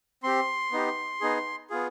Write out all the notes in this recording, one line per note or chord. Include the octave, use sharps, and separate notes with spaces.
C4 G4 C6
B3 D#4 G4
B3 D#4 G#4
B3 F4 G#4